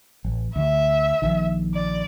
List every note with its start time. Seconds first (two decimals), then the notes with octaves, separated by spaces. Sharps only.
0.25 A1
0.56 D2 E5
1.22 A#1 D#3
1.74 D5